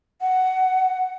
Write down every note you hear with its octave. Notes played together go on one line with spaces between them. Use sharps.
F#5